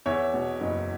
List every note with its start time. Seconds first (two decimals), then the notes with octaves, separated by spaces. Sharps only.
0.06 E2 C#5 E5
0.34 B2
0.61 F#1